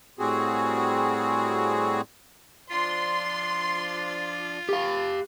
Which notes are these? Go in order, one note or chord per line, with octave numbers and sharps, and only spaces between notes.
A2 G3 C4 F#4 G#4
F3 D4 F4 D5 C6
G4 F5